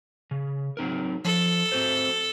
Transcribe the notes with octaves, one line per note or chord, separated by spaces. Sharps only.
C#3
F#3 C4 D#4 A#4
F3 A4
C4 F#4 C5